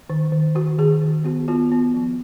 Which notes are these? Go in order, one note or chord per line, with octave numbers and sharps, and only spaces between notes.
D#3
D#3
D#3 F#4
D#3 G#4
D#3
B3 F#4
B3 F4
B3
F3